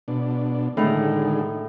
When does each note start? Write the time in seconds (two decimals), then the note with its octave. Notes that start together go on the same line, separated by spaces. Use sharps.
0.08 B2 D4
0.77 A2 D3 D#3 G#3 D#4